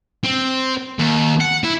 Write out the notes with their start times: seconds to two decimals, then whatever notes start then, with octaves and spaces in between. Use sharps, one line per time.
0.24 C4
0.99 D#2
1.41 F#5
1.64 E4